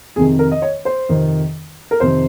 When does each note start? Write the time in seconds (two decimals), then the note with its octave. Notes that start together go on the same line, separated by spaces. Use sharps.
0.16 F2 C3 D#3 G#4
0.39 A#4
0.51 D#5
0.62 C#5
0.85 C5
1.09 F2 C3 D#3
1.91 A#4
2.00 F2 C3 D#3 C5